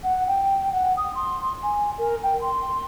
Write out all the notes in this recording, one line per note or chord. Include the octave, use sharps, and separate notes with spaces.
F#5
G5
F#5
D#6
C6
G#5
A#4
G5
C6